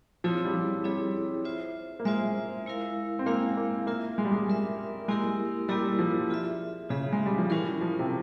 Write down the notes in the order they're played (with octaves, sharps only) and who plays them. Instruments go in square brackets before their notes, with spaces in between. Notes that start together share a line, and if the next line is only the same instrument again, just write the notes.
[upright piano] F3 [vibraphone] C4 E4 G#4 C#5
[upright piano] G3
F3
[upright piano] G3 [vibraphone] C4 E4 G#4 C#5
[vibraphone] F4 C5 E5
[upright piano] A#3
[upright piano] G#3 [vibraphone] F4 C5 E5
[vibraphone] G#3 E4 A#4 F5
[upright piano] C4
[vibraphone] G#3 E4 A#4 F5 [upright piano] A#3
[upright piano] A#3
[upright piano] A#3 [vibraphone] F4 A#4 E5
[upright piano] G#3
G3
G#3
[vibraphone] F4 A#4 E5
[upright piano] G#3 [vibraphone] A#3 E4 G4 A#4
[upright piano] G3 [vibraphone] A#3 E4 G4 A#4
[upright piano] F3
[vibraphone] F4 G#4 E5
[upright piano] C#3 [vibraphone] F4 G#4 E5
[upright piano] G#3
G3
F3
[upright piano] E3 [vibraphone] G3 C#4 F4 A#4
[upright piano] F3
C3